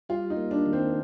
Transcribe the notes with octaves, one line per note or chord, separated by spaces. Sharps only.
G3 F4
D#4
A#3
D4
D#3
C4